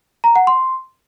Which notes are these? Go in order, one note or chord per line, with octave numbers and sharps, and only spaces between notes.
A#5
F#5
C6